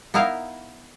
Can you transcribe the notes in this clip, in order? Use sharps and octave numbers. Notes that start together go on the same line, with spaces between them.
B3 D#4 E4 A#4 F5